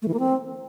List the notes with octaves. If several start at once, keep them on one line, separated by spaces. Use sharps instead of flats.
A3
E3
A#3
C4